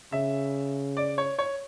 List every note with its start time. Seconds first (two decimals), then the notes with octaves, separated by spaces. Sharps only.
0.12 C#3 E5
0.97 D5
1.18 C#5
1.39 C#5